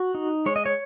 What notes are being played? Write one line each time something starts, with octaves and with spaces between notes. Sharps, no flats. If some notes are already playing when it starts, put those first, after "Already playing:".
Already playing: F#4
D#4
G#3 C#5
D#5
C#5